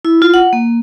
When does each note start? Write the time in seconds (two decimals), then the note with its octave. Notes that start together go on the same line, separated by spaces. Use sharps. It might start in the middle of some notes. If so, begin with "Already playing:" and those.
0.05 E4
0.22 F4
0.34 F#5
0.53 A#3